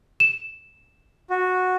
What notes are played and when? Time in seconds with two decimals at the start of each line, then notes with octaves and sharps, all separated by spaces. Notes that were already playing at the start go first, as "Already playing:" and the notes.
0.20 E7
1.30 F#4